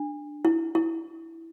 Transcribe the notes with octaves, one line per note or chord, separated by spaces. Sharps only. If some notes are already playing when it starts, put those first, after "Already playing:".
Already playing: D4
E4
E4